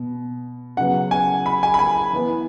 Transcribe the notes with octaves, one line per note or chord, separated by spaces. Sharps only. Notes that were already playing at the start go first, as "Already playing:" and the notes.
Already playing: B2
C#3 F#3 B3 F#5
G#5
B5
G#5
B5
G#5
E3 B3